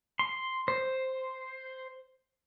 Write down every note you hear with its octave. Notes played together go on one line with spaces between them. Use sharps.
C6
C5